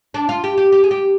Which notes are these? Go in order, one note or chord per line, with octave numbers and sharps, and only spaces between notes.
D4
F4
G4
G4
G4
G#4
G4